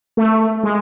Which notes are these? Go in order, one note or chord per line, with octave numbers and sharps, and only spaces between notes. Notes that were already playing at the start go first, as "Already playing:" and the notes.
A3
G#3